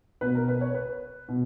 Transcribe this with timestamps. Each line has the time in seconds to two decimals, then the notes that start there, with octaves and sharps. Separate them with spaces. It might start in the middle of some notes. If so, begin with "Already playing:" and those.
0.21 B2 B4
0.35 A#4
0.48 B4
0.61 C#5
0.75 B4
1.29 B2